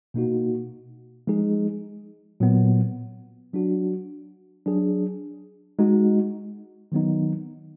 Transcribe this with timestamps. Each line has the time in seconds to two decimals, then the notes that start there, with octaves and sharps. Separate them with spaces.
0.14 B2 A#3 D#4 F#4
1.27 F3 G#3 D#4 G#4
2.40 A#2 F#3 B3
3.53 F#3 D4 F#4
4.66 F#3 D4 G#4
5.79 G#3 D#4 F#4
6.92 D#3 F#3 B3 D#4